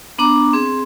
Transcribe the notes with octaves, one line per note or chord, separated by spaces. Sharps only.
B3 D4 A#5 D6
C4 G#4